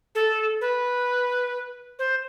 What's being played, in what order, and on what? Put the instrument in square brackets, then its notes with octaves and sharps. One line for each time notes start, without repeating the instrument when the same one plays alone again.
[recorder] A4
B4
C5